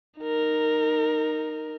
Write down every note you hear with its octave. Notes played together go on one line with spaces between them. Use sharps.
D#4 A#4